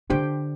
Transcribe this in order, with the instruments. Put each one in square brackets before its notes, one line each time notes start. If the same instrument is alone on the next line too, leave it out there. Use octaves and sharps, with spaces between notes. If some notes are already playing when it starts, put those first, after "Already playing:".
[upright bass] D3 [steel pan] D4 G4 C5 G5